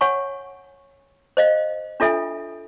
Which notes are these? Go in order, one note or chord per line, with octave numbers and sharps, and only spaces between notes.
C#5 F#5 G#5 C#6
C5 D#5 F5
D4 F4 A4 E5 G#5